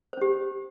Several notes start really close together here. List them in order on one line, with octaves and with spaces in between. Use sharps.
C5 C#4 G4